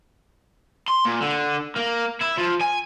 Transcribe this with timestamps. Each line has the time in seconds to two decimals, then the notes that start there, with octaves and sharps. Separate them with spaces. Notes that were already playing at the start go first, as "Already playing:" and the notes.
0.88 C6
1.06 A#2
1.21 D3
1.76 A#3
2.22 E4
2.38 F3
2.61 G#5